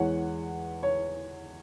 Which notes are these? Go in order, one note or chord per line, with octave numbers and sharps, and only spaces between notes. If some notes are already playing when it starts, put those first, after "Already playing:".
Already playing: E2 E3 G#3 C#5 F#5
C#5